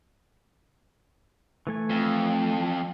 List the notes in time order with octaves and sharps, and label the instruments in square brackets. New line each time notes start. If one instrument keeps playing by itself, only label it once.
[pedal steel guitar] E3 A3 G#5
[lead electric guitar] F2